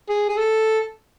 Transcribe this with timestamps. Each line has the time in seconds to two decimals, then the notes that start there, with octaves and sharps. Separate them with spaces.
0.09 G#4
0.29 G#4
0.37 A4